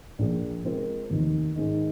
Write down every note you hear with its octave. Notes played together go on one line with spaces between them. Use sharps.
A#1 A#2 F3 A#3 G#4
C3 G#3 C4 F4 A#4
F1 D#2 D#3
G#2 D#3 G#3